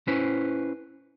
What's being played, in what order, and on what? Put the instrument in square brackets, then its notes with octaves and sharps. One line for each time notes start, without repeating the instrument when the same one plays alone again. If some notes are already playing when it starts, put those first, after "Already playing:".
[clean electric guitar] C#4 E4 B4 C5